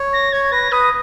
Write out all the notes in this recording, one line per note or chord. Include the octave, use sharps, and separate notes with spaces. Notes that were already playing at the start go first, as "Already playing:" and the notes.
Already playing: C#5
A#6
C#5 G#6
B4 A#6
B4 D#6